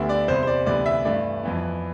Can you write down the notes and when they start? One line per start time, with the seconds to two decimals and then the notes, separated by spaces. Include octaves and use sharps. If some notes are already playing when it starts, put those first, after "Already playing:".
Already playing: D2 D3 G3 B3 E5
0.09 D5
0.28 E2 C3 G3 C5
0.43 C5
0.47 D5
0.66 D2 C3 E3 G3 B3 D5
0.86 E5
1.05 G2 E3 A3 D5
1.43 F2 E3 B3